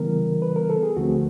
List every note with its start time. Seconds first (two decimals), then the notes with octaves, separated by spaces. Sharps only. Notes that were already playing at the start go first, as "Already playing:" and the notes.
Already playing: C#3 E3 G3 B3 A#4
0.42 B4
0.56 A#4
0.70 A4
0.83 G#4
0.96 D2 D3 F3 A3 C4 F#4